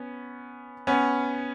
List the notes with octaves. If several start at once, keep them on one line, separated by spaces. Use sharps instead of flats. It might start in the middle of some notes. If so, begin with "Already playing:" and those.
Already playing: B3 C#4
B3 C#4